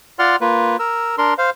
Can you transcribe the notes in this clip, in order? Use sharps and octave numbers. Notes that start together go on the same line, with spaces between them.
F4 D5 F#5 C6 F6
A#3 F4 B4
A#4 E6
D4 A#4 C6
C5 F5